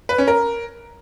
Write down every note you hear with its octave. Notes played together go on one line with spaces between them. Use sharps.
B4
C#4
A#4